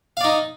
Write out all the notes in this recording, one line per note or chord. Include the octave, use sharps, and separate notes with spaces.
D#4 D5 F5